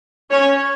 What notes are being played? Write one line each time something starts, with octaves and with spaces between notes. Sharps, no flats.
C#4 C#5